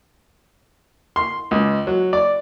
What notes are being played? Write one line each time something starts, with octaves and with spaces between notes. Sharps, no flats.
C6
C#2
F#3
D5